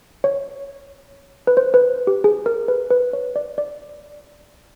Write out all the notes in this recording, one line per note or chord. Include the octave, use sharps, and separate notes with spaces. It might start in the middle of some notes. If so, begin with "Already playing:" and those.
C#5
B4
C5
B4
G4
G#4
A#4
B4
B4
C#5
D5
D5